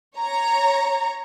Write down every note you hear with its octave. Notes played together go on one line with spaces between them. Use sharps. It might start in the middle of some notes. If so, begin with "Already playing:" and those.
C#5 A#5